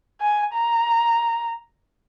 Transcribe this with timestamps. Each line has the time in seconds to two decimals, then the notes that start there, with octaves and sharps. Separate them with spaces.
0.21 G#5
0.54 A#5